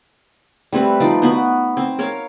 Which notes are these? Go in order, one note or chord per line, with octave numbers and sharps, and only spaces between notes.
G3 A3 C4 B4
F3 D#4 B4 D5
B3 F#4 B4
C4
A#4 C#5 F5